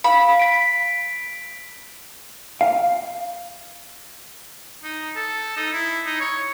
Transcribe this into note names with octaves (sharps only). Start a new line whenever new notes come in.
F5 B5
B6 D7
F5
D#4
A4
D#4
E4
D#4
C#5